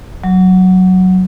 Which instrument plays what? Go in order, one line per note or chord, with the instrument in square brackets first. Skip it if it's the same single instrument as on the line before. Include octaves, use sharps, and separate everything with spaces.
[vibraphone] F#3